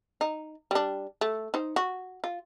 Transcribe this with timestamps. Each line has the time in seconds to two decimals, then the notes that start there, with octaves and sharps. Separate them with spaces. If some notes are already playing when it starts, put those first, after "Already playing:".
0.21 D#4
0.71 G3 D4
1.21 A3
1.54 D#4 C5
1.76 F#4
2.24 F4